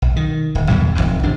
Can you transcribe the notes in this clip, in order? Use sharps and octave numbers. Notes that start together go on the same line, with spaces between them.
B1
D#3
D1
E2 B2 D#3 G3
D1 A#1 F2 G#2
G#1 C3 D4